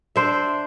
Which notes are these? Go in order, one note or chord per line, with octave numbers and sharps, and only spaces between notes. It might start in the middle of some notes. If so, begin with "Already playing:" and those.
D4 C5 E5